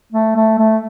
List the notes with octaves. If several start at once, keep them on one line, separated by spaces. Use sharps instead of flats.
A3
A3
A3